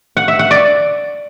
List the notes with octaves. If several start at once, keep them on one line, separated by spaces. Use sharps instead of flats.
F#5
E5
F#5
D5